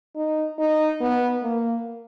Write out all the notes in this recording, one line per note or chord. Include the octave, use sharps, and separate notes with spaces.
D#4
D#4
B3
A#3